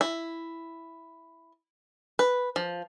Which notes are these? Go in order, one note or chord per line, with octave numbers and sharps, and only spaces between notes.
E4
B4
F3